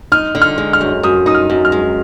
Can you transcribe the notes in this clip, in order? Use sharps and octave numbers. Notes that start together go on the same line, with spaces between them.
D#4 F6
D3
F6
G#3
F6
F#2
F#2 D#6
D#4 D#6
F6
F#2
F6
G#3